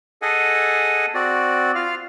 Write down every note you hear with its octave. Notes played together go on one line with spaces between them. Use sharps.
G#4 A4 D#5 F#5 G#5
C4 F#4 D5
F4 F5